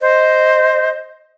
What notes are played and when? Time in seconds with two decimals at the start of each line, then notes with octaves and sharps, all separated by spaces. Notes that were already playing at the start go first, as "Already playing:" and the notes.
0.01 C5 D#5